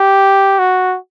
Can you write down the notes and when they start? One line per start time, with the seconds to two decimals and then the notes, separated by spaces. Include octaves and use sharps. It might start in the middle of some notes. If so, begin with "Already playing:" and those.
Already playing: G4
0.59 F#4